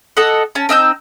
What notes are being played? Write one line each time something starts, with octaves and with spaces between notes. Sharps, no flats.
A4 D#5 F#5
C#4 A5
C4 D#4 E6 G6